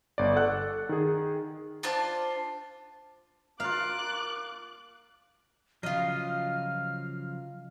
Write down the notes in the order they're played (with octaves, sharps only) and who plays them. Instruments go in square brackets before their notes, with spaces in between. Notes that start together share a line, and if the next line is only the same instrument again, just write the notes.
[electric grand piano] G1 D5
A4 F#5 F#6
D#3 G#4
[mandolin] D4 F4 C5 A5
[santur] A#3 F4 [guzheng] F5 [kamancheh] D6 F#6
[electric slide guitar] C#3 F3 F#3 [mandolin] F4 D#5 [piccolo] F6